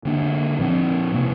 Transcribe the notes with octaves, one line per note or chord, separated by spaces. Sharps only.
D3 A#3 D4
A#2 F3 C4
C3 A#3